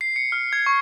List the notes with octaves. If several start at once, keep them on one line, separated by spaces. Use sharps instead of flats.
C7
C#7
F6
G#6
C#6